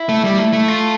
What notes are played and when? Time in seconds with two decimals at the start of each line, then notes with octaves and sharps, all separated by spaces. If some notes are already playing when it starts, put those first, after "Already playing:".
Already playing: E4
0.09 A3
0.24 G3
0.38 A3
0.53 A3
0.68 F4